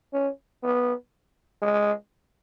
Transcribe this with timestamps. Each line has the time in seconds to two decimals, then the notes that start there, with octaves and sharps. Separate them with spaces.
0.13 C#4
0.63 B3
1.62 G#3